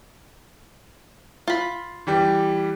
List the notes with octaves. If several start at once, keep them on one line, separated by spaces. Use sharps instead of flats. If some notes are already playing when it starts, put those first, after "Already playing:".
F4 B5
E3 G3 G4